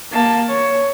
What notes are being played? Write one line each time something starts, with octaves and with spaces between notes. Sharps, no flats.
A#3 A5
C#5